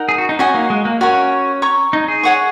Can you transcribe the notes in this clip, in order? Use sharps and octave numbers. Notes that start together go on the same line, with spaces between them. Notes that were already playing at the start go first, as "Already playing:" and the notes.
Already playing: D#4 A#4 F#5
G#4
F#4
D#4
C#4 F#4 D#5 G#5 D#6
A#3
G#3
A#3
C#4 F#4 A#4 C#5
C#5 A#5 C#6
D#4
G#4
C#5 F#5 C#6